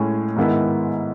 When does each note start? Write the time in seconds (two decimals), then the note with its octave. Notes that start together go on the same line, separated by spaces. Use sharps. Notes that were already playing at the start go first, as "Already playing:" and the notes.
Already playing: A2 G#3 C#4 G#4 C#5
0.36 G#2 D#3 G#3 B3 E4